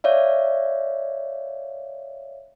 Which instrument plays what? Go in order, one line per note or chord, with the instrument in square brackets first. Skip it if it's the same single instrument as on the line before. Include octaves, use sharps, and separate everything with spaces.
[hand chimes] C#5 D5 E5 F5